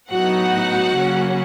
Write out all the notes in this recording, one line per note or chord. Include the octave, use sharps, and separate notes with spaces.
A2 F#3 B3 D#4 F#4 F#5
C#3 F#3 A#3 C#4